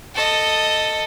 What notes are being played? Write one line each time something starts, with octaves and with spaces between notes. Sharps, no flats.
A4 D#5